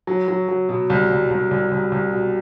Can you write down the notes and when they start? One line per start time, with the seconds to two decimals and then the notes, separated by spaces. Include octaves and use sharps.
0.07 F#3
0.28 F#3
0.48 F#3
0.69 B2
0.90 C2
1.10 C2
1.31 C2
1.51 C2
1.71 C2
1.92 C2
2.12 B2